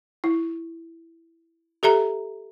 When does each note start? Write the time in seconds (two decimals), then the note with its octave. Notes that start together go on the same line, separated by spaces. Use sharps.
0.24 E4
1.83 G4 A4 E5 A#5